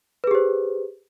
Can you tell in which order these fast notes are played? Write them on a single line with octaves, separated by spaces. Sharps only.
B4 G#4 G4 C5